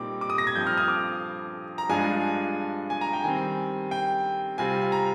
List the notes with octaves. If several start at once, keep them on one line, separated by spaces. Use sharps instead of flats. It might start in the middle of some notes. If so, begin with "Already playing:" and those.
Already playing: A#2 G3 C4 D#4 D6
D6
D#6
A#6
G#6
G2 F3 C4 G6
F6
D#6
D6
A#5
G2 F3 G#3 D4 F4 G#5
G#5
A#5
G5
D#3 G3 C4 G#5
G5
C3 G3 C4 F4 G#5
G#5
A#5